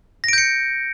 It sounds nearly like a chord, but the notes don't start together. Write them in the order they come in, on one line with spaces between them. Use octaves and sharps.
A#6 D7 G6 C#7